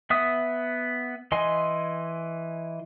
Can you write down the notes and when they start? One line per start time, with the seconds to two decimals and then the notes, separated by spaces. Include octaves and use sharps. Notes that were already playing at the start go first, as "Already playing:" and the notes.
0.10 B3 E5 D#6
1.32 E3 D#5 G#5 C6